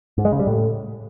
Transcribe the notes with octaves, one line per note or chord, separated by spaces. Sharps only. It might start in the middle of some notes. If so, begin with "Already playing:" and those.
G#2
G#3
C#3
G3
A2